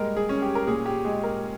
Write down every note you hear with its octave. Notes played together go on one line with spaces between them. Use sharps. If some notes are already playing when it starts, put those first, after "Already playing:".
Already playing: A#2 G3 G#3 A#4
G#4
C#4
G4
A#4
A#2 G#4
G4
G#3 G#4
A#4